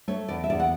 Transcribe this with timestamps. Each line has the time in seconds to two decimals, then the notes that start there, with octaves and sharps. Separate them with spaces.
0.08 A3 C#5
0.28 E2 D5
0.44 E5
0.50 E2 D5
0.60 F#5